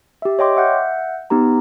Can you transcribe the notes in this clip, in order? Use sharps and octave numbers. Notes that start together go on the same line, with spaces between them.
G4 E5
C#5 D#5 G5 C6 D6
E5 F#5 G6
B3 D#4 G4 A#5